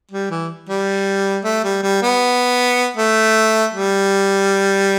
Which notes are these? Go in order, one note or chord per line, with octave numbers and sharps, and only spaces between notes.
G3
E3
G3
A3
G3
G3
B3
A3
G3